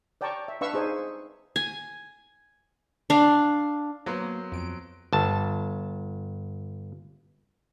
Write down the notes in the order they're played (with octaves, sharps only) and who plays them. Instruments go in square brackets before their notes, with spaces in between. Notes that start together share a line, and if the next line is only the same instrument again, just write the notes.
[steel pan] C#5 D5 G5 A5 A#5 C#6
E5
D4 B4 E5 F5 C#6 E6
D#4 G#4 C5
[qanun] G#5
D4 F5
[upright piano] F#3 B3 C5 [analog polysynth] A#3
[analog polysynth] F2 D7
[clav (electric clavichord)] G1 A5